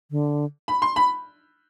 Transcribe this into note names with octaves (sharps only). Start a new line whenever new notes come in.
D3
B5
C6
B5